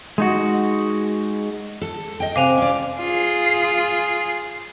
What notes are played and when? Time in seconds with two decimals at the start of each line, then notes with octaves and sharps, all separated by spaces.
0.18 G#3 D#4 F#4
1.82 A4
2.20 D#5 G5
2.36 C3 C5 F5 G#5 D6 F7
2.58 C#4 D5
2.99 F4 G#4